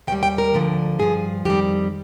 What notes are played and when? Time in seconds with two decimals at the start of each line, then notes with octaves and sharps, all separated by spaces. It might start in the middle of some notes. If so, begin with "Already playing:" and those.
0.07 D#2 D#3 G3 G5
0.23 G5
0.38 A#4
0.54 D2 D3 F3
0.99 G2 F3 G#4
1.45 F2 D#3 G3 G4